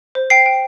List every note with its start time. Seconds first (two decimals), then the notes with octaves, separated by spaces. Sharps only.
0.15 C5
0.30 G5 C7
0.46 G5